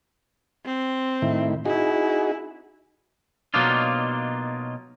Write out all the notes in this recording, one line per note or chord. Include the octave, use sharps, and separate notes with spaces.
C4
A2 D#3 E4
D#4 E4 F#4 G#4
B2 F#3 A#3 D4 D#4 F4